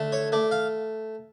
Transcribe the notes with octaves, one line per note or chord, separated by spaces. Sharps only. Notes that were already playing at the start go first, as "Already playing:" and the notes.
Already playing: D3 A3
C#5
A3 D5
F5